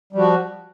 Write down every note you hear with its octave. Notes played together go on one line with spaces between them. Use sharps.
F3 G3 F#4